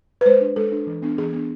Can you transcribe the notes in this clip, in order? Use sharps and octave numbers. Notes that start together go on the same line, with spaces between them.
B4
G#3 C5
D4
G#3 A4
D4
E3
B3 D4
E3 G#4
B3 D4